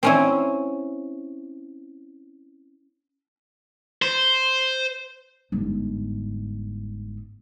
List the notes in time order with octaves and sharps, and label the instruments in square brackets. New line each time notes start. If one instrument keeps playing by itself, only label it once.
[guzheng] C4 C#4 E4
[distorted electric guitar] C5
[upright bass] G1 G#2